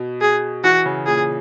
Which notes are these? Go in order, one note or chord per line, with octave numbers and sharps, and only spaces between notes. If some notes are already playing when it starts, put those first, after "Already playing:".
Already playing: B2
G#4
E3 F#4
C#3
A#2 G#4